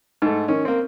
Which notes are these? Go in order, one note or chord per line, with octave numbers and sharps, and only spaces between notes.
G#2 A3
D#3 C#4
A#3 C4